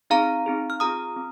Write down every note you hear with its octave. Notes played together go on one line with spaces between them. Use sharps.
C4 D#4 G#4 F5 A#5
C4 D#4 G#4
F6
C4 F4 G#4 A#5 D#6
C4